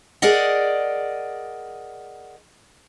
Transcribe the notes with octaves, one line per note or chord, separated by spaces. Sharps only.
G#4 A#4 D5 D#5 F#5